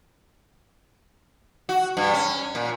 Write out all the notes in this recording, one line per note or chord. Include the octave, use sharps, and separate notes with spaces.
F#4
G2
C#4
A#2